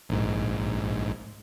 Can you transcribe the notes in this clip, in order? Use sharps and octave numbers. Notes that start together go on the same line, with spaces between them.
A#1 G#2